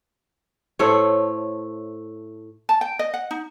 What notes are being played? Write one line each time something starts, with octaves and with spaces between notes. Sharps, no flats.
A2 A3 C5 C#5
A5
G5
D#5
F#5
D#4